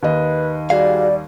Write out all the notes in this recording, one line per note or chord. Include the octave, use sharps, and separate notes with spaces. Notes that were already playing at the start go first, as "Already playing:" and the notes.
D#2 B4 D#5
G3 F#4 G#4 D5 F5